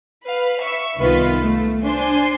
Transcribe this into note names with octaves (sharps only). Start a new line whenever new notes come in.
B4 F5
E5 C#6
C2 D#3 B3 F4 B4 B6
A3
D4 C5 G#5 C6